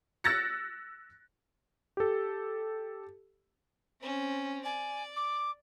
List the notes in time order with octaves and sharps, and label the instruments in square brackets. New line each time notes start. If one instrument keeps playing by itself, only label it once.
[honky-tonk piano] E6 F#6 A6 A#6 C#7
[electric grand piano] G4 A4
[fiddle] C4 C#4
[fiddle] D5 [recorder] G#5
[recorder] D6